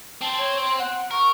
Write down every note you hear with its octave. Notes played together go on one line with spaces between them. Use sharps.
C4 A5
C#5
C6
F#5
A#4 C#6